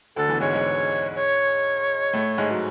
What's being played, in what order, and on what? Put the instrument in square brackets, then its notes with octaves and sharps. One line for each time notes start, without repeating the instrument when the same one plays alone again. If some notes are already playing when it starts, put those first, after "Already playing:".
[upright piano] D2 D3 [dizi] A4
[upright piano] E2 E3
[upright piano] G#2 G#3 [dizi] C#5
[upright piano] G#2 G#3
[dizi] C#5
[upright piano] A2 A3
G#2 G#3
F#3